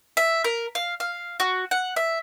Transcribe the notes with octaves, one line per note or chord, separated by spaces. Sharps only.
E5
A#4
F5
F5
F#4
F#5
E5